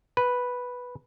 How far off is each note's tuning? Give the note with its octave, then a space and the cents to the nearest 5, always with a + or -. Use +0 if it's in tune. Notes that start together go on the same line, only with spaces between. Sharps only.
B4 -5